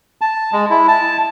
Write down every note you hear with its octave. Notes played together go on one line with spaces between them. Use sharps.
A5
G#3
E4
A5